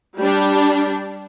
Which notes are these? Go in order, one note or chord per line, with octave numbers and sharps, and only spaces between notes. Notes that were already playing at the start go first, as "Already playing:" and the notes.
G3 D4